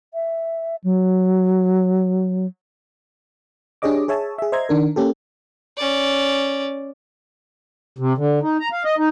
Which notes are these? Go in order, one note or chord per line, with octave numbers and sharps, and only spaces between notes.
E5
F#3
D4 G4 G#4 C#5 D#5 D6
G#4 C#5 E5 G#5 A5
G#4 E5
C5 D#5 E5 A#5 C6 G#6
D#3 D4 A#4
A#3 C#4 G4 A4
C#4 D5
C3
D3
D#4
A#5
F5
D#5
D#4